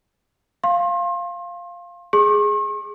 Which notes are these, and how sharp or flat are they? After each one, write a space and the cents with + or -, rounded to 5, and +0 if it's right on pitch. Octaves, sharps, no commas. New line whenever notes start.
F5 +0 C6 +35
G#4 +0 C#6 -45